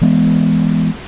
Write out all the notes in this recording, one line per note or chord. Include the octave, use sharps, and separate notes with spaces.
E3 G#3 B3